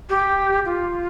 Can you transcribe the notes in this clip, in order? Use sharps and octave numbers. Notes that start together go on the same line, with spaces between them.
G4
F4